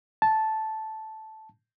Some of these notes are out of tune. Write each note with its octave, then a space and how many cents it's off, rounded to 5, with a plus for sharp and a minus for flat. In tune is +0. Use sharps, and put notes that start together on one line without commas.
A5 -5